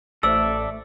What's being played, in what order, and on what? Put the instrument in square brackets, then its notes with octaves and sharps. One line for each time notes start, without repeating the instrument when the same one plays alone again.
[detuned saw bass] A1 [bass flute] A3 [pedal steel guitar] A4 D5 E5 [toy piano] C5 E6